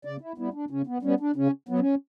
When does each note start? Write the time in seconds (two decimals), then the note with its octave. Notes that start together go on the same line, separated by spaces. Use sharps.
0.05 C#3 D5
0.21 E4
0.38 G3 B3 E4
0.54 D4
0.70 C#3 C#4
0.87 B3
1.03 G3 B3 C#4
1.20 D4
1.36 C#3 C#4
1.69 F#3 B3
1.80 C#4